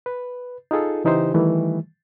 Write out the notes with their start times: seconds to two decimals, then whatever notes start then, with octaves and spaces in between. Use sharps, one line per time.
0.06 B4
0.71 D#4 F4 G#4 A4
1.04 C#3 E3 D#4 E4 G4 C5
1.34 D#3 E3 G3 A3